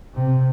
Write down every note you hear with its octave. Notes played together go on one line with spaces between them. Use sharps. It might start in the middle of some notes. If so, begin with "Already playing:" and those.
C3